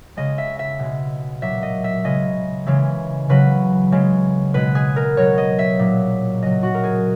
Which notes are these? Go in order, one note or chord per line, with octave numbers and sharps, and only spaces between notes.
C#3 G#3 D#5
E5
E5
B2 G#3
A#2 F#3 E5
D#5
E5
C#3 G#3 D#5
C#3 E3 G#3
C#3 F#3 B4
C#3 G#3
B2 G#3 B4
G#4
A#4
B2 F#3 C#5
D#5
E5
A#2 F#3
C#3 F#3 D#5
F#4
A#4
G#4